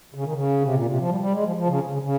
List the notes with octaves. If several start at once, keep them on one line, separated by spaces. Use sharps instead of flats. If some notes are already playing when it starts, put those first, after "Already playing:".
C#3
D#3
C#3
C3
A#2
C3
F3
G3
G3
G#3
F3
F3
C#3
C#3
C#3